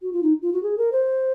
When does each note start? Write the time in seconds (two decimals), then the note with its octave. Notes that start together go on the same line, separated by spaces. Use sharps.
0.02 F#4
0.13 F4
0.23 D#4
0.42 F4
0.53 F#4
0.63 G#4
0.78 A#4
0.92 C5